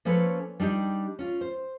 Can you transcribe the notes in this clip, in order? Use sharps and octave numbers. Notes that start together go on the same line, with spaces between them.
F3 A#3 C#4 A4 B4 C#5
G3 D4 D#4 G4
C#4 F4
C5